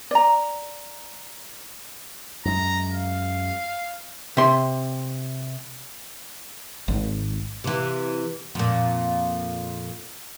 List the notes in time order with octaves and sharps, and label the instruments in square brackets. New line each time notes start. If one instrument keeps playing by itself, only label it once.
[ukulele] D5 A#5
[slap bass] F#2 G#3 [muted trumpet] A#5
[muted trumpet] F5
[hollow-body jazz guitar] C3 C6
[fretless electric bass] G#1
[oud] C3 E3
F2 A#2